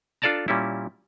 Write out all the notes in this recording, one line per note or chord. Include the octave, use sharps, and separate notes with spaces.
D4 F4 A4 D5 A5 A#5
A#2 G3 C#4 E4